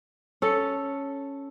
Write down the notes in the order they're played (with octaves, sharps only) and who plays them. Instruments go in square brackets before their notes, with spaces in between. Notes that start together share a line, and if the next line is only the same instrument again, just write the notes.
[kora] C#4 A4